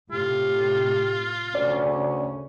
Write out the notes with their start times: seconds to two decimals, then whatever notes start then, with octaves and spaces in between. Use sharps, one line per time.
0.12 A2 C3 F4 G4
1.55 D2 C#3 C#4 D5